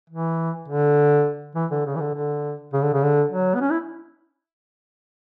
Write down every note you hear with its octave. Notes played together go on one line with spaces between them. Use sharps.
E3
D3
E3
D3
C#3
E3
D3
D3
C#3
D3
C#3
D3
F#3
B3
C#4
E4